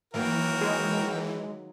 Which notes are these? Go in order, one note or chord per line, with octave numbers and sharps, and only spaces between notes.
D#3 E3 F#3 A#3 F#4 A#4 G5
G#3